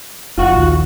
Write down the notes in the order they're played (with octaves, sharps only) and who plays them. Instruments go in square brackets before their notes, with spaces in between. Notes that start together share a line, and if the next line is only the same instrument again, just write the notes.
[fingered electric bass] F1 [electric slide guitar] F4 F#4 F#5
[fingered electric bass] A#1 D#2